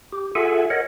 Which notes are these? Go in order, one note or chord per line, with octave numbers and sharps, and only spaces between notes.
G4
F4 G#4 A4 E5 F#5 G#5
A#4 C#5 D#5 F#5